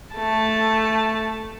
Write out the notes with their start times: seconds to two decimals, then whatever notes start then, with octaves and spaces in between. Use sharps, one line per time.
0.14 A3 A5